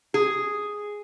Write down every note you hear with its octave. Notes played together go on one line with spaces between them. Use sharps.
G#4